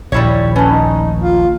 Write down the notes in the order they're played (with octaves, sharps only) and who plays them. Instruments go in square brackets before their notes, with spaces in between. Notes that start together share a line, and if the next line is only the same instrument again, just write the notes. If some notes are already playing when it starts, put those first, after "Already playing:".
[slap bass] A#1 D#2 A#2 [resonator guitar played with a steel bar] G3 E4 C#5
[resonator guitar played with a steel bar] A3 C#4 [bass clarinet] B4
[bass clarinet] D#4
F4